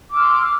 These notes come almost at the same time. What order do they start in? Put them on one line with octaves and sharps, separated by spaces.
D6 E6 F6 C6